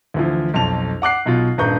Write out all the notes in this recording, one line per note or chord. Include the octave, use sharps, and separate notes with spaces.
D2 E3 F3
B1 F2 A5 F7
F#5 D6 F#6 C7
B1 B2 F4
D#1 G2 B4 A#5 C#6 G6